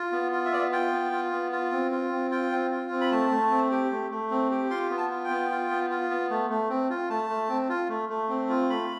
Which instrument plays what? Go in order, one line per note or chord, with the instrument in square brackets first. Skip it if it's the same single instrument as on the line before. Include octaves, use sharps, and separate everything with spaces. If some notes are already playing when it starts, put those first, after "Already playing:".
Already playing: [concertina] F4
B3
F4
E5
B3 D5
E5
F4 G5
B3
F4
B3
F4
C4
F4
C4
F4 G5
C4
F4
C4
B5
A3 A5
A3
C4
G4
A3
A3
C4
G4
F4 C6
B3
A5
F4
G5
B3
F4
B3
F4
B3
A3
A3
C4
F4
A3 A5
A3
C4
F4
A3
A3
C4
F4
A3 B5